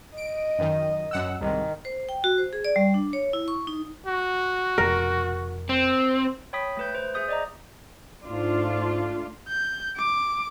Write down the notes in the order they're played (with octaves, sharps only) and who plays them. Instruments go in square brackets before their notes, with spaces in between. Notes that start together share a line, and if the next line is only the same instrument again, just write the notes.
[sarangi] D#5 [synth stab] D7
[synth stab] F#2 D#3
F#2 F#5 E6
[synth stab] C2 G#2 [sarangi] D#3
[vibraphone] C5
G5
F#4
C5
G#4
D5
G3
D4
C#5
E4
C#6
D#4
[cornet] F#4
[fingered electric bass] F1 F2 B2 [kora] A#4
[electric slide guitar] C4
[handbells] C#5 G5 B5 D#6 B6
A3 B4 G6
C5
G#4 E5 D#6 G6
D5 D#5 A#5
[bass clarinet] G#2 [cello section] A3 D4 F4
[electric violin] G6
D6